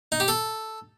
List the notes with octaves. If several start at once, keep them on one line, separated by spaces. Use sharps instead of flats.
D#4
G4
A4